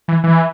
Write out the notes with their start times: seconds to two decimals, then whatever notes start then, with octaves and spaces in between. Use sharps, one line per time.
0.08 E3
0.24 E3